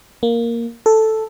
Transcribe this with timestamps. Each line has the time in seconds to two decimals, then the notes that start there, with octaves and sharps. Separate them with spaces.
0.23 A#3
0.86 A4